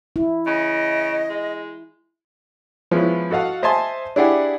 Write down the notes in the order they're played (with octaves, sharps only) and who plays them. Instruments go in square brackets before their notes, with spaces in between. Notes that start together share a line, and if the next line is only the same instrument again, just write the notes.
[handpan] E4
[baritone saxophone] C#3 [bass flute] D#5
[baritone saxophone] G#3
[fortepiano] F3 G#3 B3 C#4 E4
F#4 A4 D#5 F5 F#5
C5 D#5 E5 G#5 A5 C6
D4 E4 G4 G#4 D5 F#5